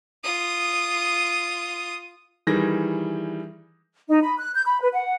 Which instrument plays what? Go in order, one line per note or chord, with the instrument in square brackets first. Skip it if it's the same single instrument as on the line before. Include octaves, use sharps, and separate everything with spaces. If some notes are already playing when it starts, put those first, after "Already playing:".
[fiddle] F4 D#6
[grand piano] D#3 E3 G3 G#4 A#6
[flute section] D#4
B5
F#6
G6
B5
B4
F#5